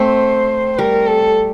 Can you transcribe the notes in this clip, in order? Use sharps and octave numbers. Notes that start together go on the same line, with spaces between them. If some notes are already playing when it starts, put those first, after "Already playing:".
Already playing: A3 C4 C5
G3 A#4
A4